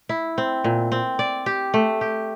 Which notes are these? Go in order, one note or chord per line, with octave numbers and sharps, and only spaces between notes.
E4
C4
A#2
C4
D5
G4
A3
G4